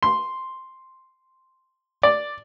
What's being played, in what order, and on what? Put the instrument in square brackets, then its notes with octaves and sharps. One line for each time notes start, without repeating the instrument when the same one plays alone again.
[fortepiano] C6
D5